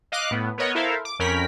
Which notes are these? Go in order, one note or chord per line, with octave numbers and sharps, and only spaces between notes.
D#5 F5 D6 F#6
A2 B3
B3 A#4 C#5 D#5 F#5
E4 A4 A#4 C5 E5 F5
D6
F2 C#4 A#4 G5 B5 B6